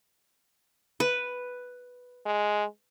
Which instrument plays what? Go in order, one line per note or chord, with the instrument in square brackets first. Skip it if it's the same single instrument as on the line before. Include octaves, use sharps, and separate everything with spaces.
[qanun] B4
[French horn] G#3